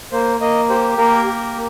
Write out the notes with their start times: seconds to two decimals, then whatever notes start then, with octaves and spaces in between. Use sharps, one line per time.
0.12 A#3 C5
0.40 A#3 D#5
0.69 G4 C5
0.98 A#3 A#4
1.27 G4